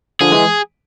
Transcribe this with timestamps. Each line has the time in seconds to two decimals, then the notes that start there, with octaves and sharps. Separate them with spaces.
0.21 D3 F3 G#4
0.32 E3 G#3